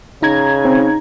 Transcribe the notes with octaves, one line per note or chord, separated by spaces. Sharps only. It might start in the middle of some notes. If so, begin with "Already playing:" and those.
C#3 D#4 A#5 G#6
C4